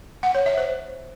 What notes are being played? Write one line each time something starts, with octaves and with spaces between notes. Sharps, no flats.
F#5
C#5
E5
C5